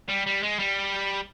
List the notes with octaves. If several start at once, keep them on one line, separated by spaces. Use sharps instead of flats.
G3
G3
G#3
G3